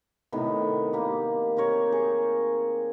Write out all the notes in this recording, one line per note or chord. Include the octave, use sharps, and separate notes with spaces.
A2 C3 D#3 B3
A#3 G4
C4 G4 A#4 C#5
G#4